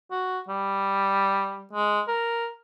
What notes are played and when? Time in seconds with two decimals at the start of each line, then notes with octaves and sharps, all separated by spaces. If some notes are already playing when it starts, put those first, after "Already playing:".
0.11 F#4
0.48 G3
1.73 G#3
2.08 A#4